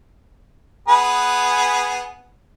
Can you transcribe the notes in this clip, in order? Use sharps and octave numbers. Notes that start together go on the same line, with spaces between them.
B3 G#4 B4